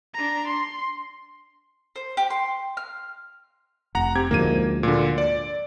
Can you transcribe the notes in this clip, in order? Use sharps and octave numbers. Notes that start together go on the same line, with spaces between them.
D4 A#5
C6
C5
G4
C6
F6
F1 F#5 A#5 A#6
C4 G4 G#6
D2 G#2 F3 A#3 D#7
A#2 D3
D5